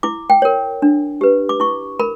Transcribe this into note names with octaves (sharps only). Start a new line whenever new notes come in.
E4 D6
G5
A#4 C#5
D4
G4 B4
D6
E4 C#6
A#4 B5